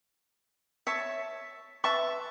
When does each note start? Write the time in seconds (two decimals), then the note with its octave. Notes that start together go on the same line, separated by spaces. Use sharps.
0.87 C#5 E5 A5 C#6
1.84 B4 E5 A5 C#6